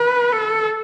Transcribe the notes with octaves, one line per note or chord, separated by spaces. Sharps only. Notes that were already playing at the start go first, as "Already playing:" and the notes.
Already playing: B4
A4